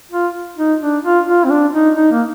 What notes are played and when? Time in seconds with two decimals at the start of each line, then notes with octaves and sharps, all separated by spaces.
0.12 F4
0.57 D#4
0.81 D4
1.04 F4
1.27 F4
1.45 C4
1.50 D4
1.73 D#4
1.97 D#4
2.12 A#3